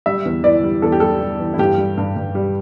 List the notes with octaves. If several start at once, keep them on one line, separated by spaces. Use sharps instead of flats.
G3 E5
E2
E3 D5
G3
E2 A4
G4
G3 A4
G3
E3
E4
G2 G4
G3
G2
G2
G3